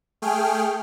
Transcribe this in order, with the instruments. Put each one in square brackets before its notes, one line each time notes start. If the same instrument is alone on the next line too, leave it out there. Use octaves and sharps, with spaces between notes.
[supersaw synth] A3 G#4 G5 F6